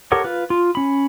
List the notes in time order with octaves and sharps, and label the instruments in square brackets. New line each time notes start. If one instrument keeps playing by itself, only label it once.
[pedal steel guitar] G4 A4 A#4 C#5 F#5
F4 B4
F4
C#4 B5